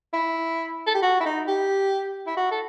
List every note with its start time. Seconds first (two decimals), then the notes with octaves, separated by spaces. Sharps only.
0.13 E4
0.87 A4
0.95 G4
1.03 F#4
1.20 E4
1.26 D#4
1.48 G4
2.27 E4
2.37 F#4
2.51 A4